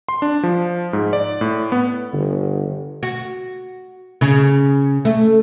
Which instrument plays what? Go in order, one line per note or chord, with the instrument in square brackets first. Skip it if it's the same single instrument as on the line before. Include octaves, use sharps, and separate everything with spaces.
[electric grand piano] C6
D4
F3
G#2
D5
A2
B3
[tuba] G1 [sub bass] D3
[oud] F#4
C#3
A3